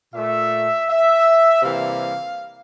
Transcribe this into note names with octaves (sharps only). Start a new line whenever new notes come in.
A#2 A3 E5
E5
C3 E3 G3 A#3 F5